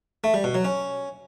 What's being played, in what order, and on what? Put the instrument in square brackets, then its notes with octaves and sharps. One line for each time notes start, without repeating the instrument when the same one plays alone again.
[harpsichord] A3
G3
B2
F#3
C#4